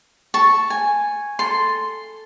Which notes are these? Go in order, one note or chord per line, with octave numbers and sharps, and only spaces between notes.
A5 C#6
G#5
A4 C6